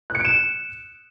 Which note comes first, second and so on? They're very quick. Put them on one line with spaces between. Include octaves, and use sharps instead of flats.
F#6 C#7 D7 E7